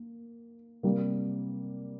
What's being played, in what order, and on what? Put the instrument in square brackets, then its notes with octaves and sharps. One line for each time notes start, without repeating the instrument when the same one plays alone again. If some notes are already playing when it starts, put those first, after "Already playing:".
Already playing: [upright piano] A#3
C3 G3 A#3